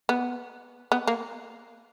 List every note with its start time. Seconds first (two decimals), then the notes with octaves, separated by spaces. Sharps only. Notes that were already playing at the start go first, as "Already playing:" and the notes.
0.09 B3
0.92 B3
1.08 A#3